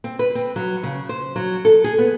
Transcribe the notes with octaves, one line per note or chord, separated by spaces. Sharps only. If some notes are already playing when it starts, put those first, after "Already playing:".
C4
B4
C4
F#3
C#3
C5
F#3
A4
G#4
B3